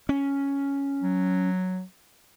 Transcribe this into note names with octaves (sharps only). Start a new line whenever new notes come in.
C#4
F#3